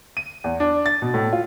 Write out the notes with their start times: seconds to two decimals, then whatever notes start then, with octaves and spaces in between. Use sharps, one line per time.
0.17 D#7
0.44 E2
0.60 D4
0.86 A6
1.02 B2
1.14 A2
1.33 F4